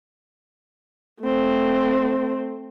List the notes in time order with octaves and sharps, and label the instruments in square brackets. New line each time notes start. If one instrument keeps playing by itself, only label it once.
[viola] A3 C4